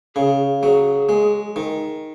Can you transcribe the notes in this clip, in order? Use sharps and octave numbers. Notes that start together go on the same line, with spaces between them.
C#3 G#4
F#3 G#4
G#3
D#3